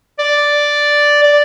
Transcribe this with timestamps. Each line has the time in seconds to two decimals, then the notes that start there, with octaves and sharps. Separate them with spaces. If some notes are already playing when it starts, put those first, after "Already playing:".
0.19 D5
1.24 D5